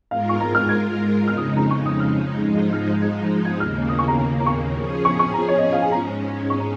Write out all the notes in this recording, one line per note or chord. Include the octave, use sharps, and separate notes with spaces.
G#2 G#3 F4 A#4 F5
C#6
A#5
F6
G#6
F2 C#3 G#3 D#4 F6
D#6
A#5
C#6
D#6
F6
G#2 F3 G#3 D#4
F6
G#6
G#6
D#2 C#3 A#3 F6
D#6
C#6
A#5
A#5
A#5
C#6
F3 C#4 G#4
C#6
C#6
A#5
C#5
D#5
C#5
F5
G#5
G#2 G#3 C#4 A#5
C#6
A#5